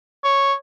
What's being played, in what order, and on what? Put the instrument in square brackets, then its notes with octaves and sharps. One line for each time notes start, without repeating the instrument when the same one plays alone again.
[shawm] C#5